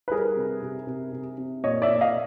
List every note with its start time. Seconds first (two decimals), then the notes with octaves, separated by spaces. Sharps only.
0.08 B4
0.11 G3 G#4 A#4
0.36 C3
0.62 C3
0.87 C3
1.12 C3
1.38 C3
1.64 A#2 C#5 D#5
1.82 D5 E5
1.88 A#2
2.01 D#5 F5